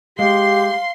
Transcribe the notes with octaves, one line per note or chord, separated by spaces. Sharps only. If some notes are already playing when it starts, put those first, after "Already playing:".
G#3 G4 F5 C6